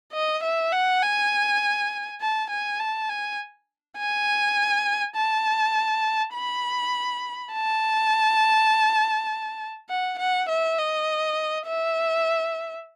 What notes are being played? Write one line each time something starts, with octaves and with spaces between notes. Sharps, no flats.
D#5
E5
F#5
G#5
A5
G#5
A5
G#5
G#5
A5
B5
A5
F#5
F#5
E5
D#5
E5